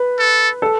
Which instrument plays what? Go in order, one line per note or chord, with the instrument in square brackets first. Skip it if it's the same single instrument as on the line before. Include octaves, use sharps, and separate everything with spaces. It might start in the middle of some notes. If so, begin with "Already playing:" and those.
Already playing: [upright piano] B4
[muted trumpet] A4
[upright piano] A4